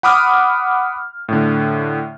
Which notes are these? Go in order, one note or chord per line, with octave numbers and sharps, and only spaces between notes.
F#5 B5 D6 D#6 F6
A2 D3